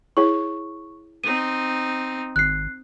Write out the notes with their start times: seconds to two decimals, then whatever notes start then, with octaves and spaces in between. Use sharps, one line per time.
0.17 E4 G#4 C#5 C#6
1.24 C4 D#4 D#7
2.36 G#1 F#6 C7